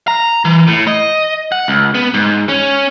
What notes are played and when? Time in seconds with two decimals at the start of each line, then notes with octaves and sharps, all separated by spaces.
0.08 A#5
0.45 E3
0.67 A2
0.87 D#5
1.52 F#5
1.68 C#2
1.95 B3
2.14 G#2
2.49 C#4